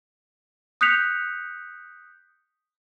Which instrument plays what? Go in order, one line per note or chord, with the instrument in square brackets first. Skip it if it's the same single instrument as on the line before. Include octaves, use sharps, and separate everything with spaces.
[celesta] D#6 F#6 G6 B6 C#7 F7